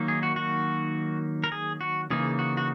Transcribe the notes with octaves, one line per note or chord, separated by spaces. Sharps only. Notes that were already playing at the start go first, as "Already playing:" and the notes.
Already playing: D#3 F#3 A#3 D#4
G#4
F#4
F#4
A#4
G#4
F#4
C#3 E3 A#3 D#4 G#4
F#4
F#4